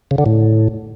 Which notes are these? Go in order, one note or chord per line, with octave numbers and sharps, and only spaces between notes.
C#3
D3
A2